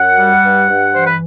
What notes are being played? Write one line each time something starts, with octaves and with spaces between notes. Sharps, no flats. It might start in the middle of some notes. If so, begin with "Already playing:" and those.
Already playing: F#2 F#5
G3
G2
G2
E3 C5
B4